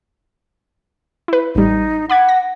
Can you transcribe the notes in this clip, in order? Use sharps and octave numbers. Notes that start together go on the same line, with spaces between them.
E4 B4
A1 G3 D#4
F#5 B5 D6 G#6
A#6